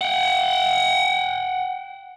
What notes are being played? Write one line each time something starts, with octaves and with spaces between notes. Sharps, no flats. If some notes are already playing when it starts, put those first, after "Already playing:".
F#5 G5